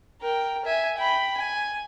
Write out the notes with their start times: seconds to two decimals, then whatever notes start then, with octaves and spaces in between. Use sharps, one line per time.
0.21 A#4 G5
0.65 E5 G#5
0.97 G5 B5
1.37 G#5